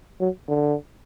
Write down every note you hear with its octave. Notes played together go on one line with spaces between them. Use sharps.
F#3
D3